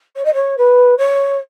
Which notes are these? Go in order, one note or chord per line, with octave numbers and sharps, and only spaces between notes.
C#5
D#5
C#5
B4
C#5